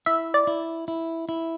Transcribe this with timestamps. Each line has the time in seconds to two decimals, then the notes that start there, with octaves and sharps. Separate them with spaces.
0.06 E4 E5
0.34 D5
0.47 E4
0.88 E4
1.29 E4